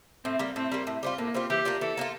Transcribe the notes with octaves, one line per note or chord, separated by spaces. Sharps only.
A2 C4
G3 A#3
A2 C4
G3 A#3
A2
G3 C4 F4
A2 A#3
G3 C4 F4
E3 G4
A#3 D4 F4
E3 A4
A#3 D4 F4